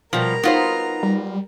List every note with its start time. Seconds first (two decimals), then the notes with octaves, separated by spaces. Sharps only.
0.13 B2 F3 G3 A#4 A#5
0.43 B3 D#4 F4 F#4 C5
1.03 G3